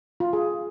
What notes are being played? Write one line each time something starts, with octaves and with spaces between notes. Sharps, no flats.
F4
G#4